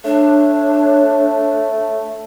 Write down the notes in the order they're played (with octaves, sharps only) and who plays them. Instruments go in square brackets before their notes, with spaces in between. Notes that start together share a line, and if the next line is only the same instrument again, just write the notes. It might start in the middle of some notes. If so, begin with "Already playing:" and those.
[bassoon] A3 [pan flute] D4 [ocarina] C#5